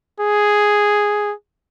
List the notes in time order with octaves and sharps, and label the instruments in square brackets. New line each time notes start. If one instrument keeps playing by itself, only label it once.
[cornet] G#4